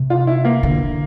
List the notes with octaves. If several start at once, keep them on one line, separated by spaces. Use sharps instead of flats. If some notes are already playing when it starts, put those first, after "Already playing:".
Already playing: C3
F4
E4
A#3
D3